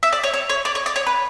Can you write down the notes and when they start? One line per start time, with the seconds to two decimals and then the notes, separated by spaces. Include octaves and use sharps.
0.03 E5
0.13 D5
0.24 C#5
0.34 C#5
0.50 C#5
0.65 D5
0.75 C#5
0.86 D5
0.96 C#5
1.07 B4